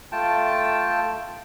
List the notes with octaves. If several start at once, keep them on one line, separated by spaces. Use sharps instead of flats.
A3 F4 G5 A5